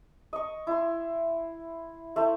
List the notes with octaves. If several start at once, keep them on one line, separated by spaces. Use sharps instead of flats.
D#5 C#6
E4 C6
A3 E4 C5